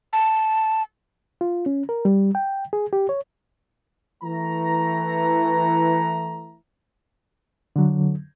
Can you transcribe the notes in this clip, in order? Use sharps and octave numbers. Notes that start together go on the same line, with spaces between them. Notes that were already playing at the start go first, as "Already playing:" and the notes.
A5
F4
C#4
A#4
G3
G5
G#4
G4
C#5
E3 A3 A#5
D3 F#3